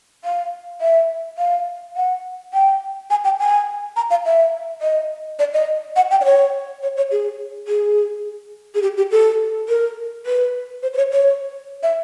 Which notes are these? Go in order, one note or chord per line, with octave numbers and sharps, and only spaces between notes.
F5
E5
F5
F#5
G5
G#5
G5
G#5
A#5
F5
E5
D#5
D5
D#5
F#5
G5
D5
C#5
C#5
C#5
G#4
G#4
G#4
G4
G4
A4
A#4
B4
C5
C5
C#5
C#5
E5